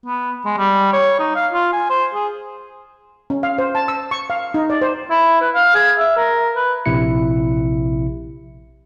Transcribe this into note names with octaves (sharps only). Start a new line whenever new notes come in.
B3
G#3
G3
C#5
D#4
F5
F4
G#5
C5
G#4
C#4
F5
C5
A5
E6
C#6
F5
D#4
D5
C5
E4
B4
F5
G#4
E5
A#4
B4
A#1 C3 E4 C#7